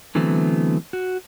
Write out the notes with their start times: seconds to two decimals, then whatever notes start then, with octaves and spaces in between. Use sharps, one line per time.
0.15 D3 E3 F#3 A3 B3 C4
0.93 F#4